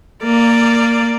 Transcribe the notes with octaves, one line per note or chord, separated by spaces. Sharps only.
A#3 D5